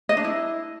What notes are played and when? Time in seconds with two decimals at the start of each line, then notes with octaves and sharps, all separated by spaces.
0.09 D#5
0.17 D4
0.24 E4